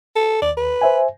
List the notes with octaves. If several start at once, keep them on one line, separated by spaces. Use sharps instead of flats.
A4
D#2 D5
B4
C5 E5 G#5